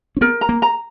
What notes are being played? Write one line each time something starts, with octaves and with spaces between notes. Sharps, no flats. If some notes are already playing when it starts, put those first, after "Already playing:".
C#4
B3 A#4
A#5
A#3
A#5